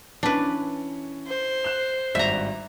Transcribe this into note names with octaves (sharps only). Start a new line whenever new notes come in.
E3 C#4 D4 B4
C5
F#6 E7
G#1 G2 D5 E5 A#5